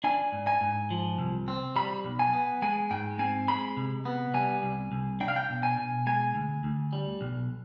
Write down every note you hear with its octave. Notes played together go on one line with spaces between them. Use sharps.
D4 G#5
G#2
G#5
G#2
F3
C2
C4
G3 B5
B1
G#5
B3
G#3 G#5
G#2 G5
C4 G#5
G#3 B5
C3
B3
G3 G#5
C2
C2
D4 G5
F5
G5
B2
G#5
B2
G#3 G#5
D2
D2
G3
B1